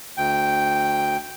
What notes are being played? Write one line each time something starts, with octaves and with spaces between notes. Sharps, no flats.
D2 G5